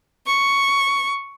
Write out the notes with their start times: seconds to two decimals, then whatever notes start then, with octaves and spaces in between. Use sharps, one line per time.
0.25 C#6